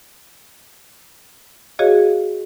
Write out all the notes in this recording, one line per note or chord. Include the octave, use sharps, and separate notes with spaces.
F#4 G#4 C#5 D#5 F5